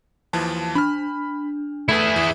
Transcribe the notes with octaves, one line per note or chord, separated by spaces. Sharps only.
D#2 E3 F3 A5
D4 B5 F6
A3 E4 G#4 B4
E3